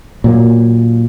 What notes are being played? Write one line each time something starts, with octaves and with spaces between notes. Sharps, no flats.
A#2 F#3 A#3